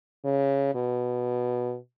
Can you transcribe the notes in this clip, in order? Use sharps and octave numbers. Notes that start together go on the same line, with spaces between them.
C#3
B2